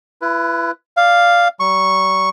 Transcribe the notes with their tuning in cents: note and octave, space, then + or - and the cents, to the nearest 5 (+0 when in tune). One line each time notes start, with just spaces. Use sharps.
E4 +35 B4 +0
D5 +0 F5 +0
G3 -45 C#6 -5